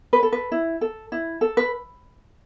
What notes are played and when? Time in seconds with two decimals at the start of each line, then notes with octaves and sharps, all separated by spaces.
0.13 B4
0.23 A4
0.32 B4
0.52 E4
0.81 A4
1.12 E4
1.41 A4
1.57 B4